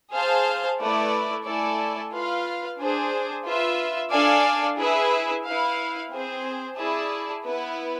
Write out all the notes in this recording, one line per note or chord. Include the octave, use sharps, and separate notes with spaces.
G#4 C5 F5 A5
A3 E4 B4 D5
A3 E4 A4 D5 G#5
F4 B4 F5
D4 G#4 C5
F4 B4 E5
D4 A4 D5 F5 G#5
E4 G#4 B4 E5
E4 B4 F5
C4 G#4 C5
E4 G#4 D5 A5
B3 E4 B4